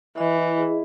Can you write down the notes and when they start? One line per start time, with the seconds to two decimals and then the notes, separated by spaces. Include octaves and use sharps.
0.18 E3 D#5
0.38 E4
0.58 G#4